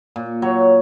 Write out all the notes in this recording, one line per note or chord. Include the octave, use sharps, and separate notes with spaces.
A#2
F#3 C#5